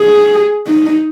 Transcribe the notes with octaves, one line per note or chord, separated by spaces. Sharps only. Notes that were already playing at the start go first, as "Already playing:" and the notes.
Already playing: G#4
D#4